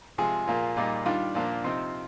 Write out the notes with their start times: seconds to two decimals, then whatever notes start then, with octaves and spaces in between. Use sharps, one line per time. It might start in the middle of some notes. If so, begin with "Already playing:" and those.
0.18 C3 F3 G#3 G#4
0.48 A#2 F3 A#3
0.77 A#2 G3 A#3 D#4
1.06 D#3 G3 D4 F4
1.35 A#2 F3 A#3 D4
1.64 C3 F3 C4 D#4